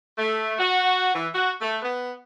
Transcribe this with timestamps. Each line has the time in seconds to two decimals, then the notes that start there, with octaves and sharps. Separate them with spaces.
0.18 A3
0.59 F#4
1.15 E3
1.35 F#4
1.61 A3
1.82 B3